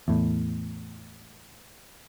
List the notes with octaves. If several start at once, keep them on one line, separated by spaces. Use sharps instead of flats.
E2 A2